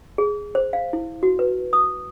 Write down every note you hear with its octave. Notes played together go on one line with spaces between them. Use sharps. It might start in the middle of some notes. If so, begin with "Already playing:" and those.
G#4
C5
F5
E4
F#4
B4
D#6